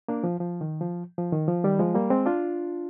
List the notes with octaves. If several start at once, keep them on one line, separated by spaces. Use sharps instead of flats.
A#3 D4
F3
F3
D#3
F3
F3
D#3
F3
D#3 G3
F3 G#3
G3 A#3
G#3 C4
D4 F4